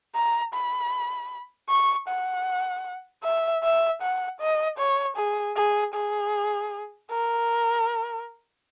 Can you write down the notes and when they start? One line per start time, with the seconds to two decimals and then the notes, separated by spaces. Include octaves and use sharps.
0.16 A#5
0.54 B5
1.70 C#6
2.09 F#5
3.24 E5
3.64 E5
4.02 F#5
4.41 D#5
4.79 C#5
5.17 G#4
5.57 G#4
5.95 G#4
7.11 A#4